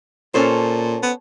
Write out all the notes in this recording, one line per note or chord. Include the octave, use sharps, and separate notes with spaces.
A#2 C#4 A4 C5
B3